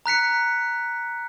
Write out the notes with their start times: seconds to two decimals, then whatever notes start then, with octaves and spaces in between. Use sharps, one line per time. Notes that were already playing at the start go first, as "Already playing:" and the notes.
0.06 A#5 F#6 B6 C#7